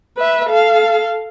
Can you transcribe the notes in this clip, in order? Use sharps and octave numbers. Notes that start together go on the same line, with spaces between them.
B4 E5
A4 F5